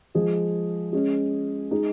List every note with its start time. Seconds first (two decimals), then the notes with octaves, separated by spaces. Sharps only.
0.15 F3 G#3 F4 G#4
0.93 G#3 C#4 G#4
1.71 G#3 D#4 G#4